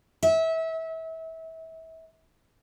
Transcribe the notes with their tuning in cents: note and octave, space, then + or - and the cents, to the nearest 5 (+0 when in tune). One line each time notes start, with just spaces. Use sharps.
E5 -30